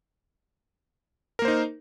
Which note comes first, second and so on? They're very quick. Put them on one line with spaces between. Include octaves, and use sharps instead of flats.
A#4 A#3 C5 D#4